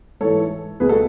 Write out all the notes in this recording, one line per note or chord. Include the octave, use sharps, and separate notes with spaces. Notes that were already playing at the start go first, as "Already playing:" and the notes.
G#2 E3 A4 C#5
C#2 B2 G#4 B4
F#4 A4